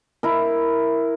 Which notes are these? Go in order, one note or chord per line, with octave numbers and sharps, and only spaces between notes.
E4 A#4